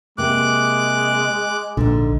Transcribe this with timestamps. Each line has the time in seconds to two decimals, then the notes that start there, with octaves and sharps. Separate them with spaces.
0.18 C3 G#3 A#3 D6 F#6
1.77 A#1 G#2 D3